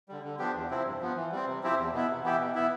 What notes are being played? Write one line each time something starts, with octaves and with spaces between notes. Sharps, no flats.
D3 G3
D3
F3 B3 D4 G4
E2
C3 F3 C4 E4
G2
F3 B3
E3
G3 C4
C3
F3 C4 E4 G4
E2
B2 B3 E4
C3
E3 B3 E4 G4
B2
B3 E4